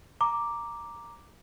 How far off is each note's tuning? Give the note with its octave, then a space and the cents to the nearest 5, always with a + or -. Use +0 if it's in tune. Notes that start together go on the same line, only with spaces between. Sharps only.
A#5 +0 D6 +0